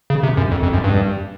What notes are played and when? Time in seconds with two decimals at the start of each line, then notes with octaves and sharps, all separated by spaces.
0.10 C#3
0.23 C3
0.37 F#2
0.51 F2
0.63 F2
0.73 F#2
0.84 G2